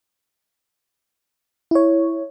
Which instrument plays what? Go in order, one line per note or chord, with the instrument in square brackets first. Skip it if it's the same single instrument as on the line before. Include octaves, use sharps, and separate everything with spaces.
[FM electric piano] E4 C#5